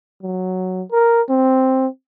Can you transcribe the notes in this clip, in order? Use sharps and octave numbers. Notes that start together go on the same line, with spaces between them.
F#3
A#4
C4